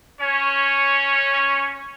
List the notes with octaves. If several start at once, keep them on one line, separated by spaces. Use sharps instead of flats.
C#4 C#5